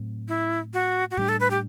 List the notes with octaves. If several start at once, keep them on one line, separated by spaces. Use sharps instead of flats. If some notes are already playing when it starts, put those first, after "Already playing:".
Already playing: A2 F#3 C4
E4
F#4
F#4
A2 G3 B3 D4 G4
A4
B4
G4